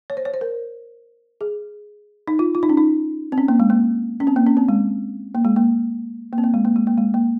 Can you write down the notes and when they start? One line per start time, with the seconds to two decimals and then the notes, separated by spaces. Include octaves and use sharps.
0.10 C#5
0.17 C5
0.25 C#5
0.34 C5
0.41 A#4
1.41 G#4
2.28 D#4
2.39 F4
2.55 F4
2.63 D#4
2.69 C#4
2.77 D#4
3.32 C4
3.38 C#4
3.48 A#3
3.60 G#3
3.70 A#3
4.20 C#4
4.27 C4
4.36 A#3
4.46 C#4
4.57 C4
4.69 G#3
5.35 A#3
5.45 G#3
5.56 A#3
6.33 A#3
6.38 C4
6.44 A#3
6.54 G#3
6.65 A#3
6.76 G#3
6.87 A#3
6.98 G#3
7.14 A#3